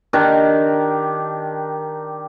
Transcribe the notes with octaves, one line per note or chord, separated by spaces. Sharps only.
D#3 D4 G4 A#4